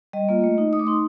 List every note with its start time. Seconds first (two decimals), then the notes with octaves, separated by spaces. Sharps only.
0.13 G3 D#5
0.29 A#3 F4
0.43 A3
0.58 D#4
0.73 A3 D#6
0.79 D6
0.87 D#4 C6